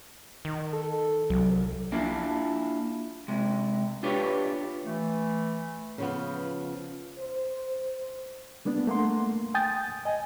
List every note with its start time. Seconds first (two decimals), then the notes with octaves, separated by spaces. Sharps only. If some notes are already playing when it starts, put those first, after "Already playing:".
0.45 D#3
0.73 A4
1.30 C2 F#3
1.92 A#3 D4 E4 F4 F5
3.28 C3 G#3
4.03 D4 F4 G4 B4 C#5
4.84 E3 A3
5.98 C#3 F3 B3
7.19 C5
8.65 G3 A#3 B3 D4
8.87 A3 A#3 F#5 C6
9.54 G5 G#5 D#6 G6 A6
10.05 D#5 G#5